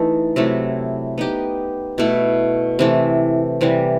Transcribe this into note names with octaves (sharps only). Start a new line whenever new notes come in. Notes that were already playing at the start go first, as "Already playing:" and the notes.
Already playing: E3 A3 D#4 A4
C3 F#3 A3 E4
B3 D#4 G4 D#5
B2 A3 E4
C3 E3 A3
C3 E3 G3